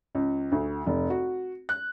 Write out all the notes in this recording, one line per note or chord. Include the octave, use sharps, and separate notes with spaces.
C#2
D2
F1
F#4
F#6